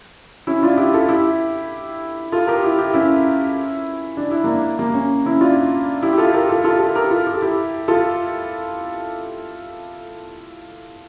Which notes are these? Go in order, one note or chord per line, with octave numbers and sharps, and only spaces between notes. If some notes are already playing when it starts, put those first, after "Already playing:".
C#4 E4
D4 F4
E4 G4
F4 A4
E4 G4
F4 A4
G4 A#4
E4 G4
E4 G4
C#4 E4
D4
E4
A#3 D4
A#3
C#4
C#4 E4
D4 F4
E4 G4
G4
F4 A4
G4 A#4
F4 A4
F4 A4
F4 A4
G4 A#4
F4 A4
G4
A4
E4 G4
F4 A4